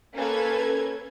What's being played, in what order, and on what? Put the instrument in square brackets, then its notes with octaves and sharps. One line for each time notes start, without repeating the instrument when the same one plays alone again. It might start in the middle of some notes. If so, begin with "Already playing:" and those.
[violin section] A#3 C#4 A4 B4 G#6